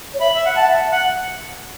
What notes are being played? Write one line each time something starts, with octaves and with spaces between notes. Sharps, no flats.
C#5
E5 B5
E5
F#5
F#5 A5
E5
F#5